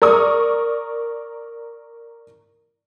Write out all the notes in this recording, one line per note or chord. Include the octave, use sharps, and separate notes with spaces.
A#4 D5 C#6 D#6